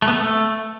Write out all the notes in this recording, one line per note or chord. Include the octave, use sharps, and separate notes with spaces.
A3
B3
A3